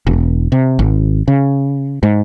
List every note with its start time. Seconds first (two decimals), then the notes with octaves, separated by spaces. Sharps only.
0.07 E1
0.52 C3
0.79 G#1
1.28 C#3
2.03 G#2